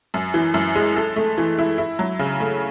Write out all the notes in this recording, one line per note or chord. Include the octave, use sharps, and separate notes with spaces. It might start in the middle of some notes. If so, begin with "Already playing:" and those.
F#2
E3
F#2
G#3
A4
A3
E3
E4
E4
F#3
C#3
A3